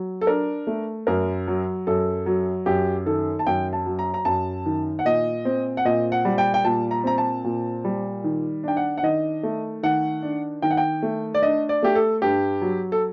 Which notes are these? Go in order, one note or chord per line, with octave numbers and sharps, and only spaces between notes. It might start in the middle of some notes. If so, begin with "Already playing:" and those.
Already playing: F#3
A4
D4 A#4
A3
F#2 A#4
F#3
F#2 A4
F#3
F#2 G4
D#3 A4
A5
F#2 G5
A5
F#3
A#5
A#5
F#2 A5
D#3
F#5
A#2 D#5
C4
F#5
A#2 D#5
F#5
G3
G5
G5
A#2 A5
A#5
C4 A#5
A5
A#2
G3
D#3
D4 G5
F#5
F#5
D#3 D#5
A3
D#3 F#5
D4
D#3 G5
F#5
G5
A3
D5
D4 D#5
D5
A3 G4
A4
G2 G4
F#3
A4